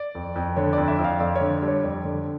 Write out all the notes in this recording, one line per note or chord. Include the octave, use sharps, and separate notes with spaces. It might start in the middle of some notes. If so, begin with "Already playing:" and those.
Already playing: D5
F2
F2
D3 C#5
F2 D5
E5
F2
F5
F2 D5
C#5
D3
G3
C#5
F2 D5
D3